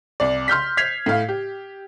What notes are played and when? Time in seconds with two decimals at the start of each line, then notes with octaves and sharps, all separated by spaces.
0.20 C2 D5
0.48 C6 F6 G6 B6
0.77 G#6 B6 C7 F7
1.06 A2 F5
1.29 G4